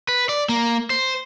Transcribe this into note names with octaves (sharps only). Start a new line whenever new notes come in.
B4
D5
A#3
C5